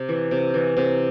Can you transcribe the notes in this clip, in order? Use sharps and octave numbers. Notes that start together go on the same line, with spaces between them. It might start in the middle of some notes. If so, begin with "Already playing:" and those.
Already playing: C3
E3
C3
E3
C3